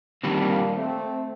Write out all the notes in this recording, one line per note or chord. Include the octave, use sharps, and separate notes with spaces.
D#3 G3 A#3 C4 D4
A3 C4